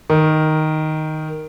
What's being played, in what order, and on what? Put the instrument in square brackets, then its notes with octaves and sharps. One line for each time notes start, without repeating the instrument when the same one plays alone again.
[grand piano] D#3